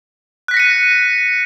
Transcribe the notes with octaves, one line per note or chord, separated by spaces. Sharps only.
F#6 A#6 B6 C#7 D#7